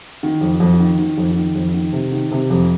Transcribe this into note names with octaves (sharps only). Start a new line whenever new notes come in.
D#3
F2
F2
D#3
D#3
F2
D#3
F2
D#3
C3
D#3
C3
F2